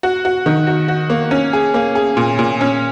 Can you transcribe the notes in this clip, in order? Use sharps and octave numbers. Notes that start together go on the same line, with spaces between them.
F#4
F#4
D#3
F#4
F#4
A#3
C#4
G#4
A#3
G#4
A#2
A#2
C#4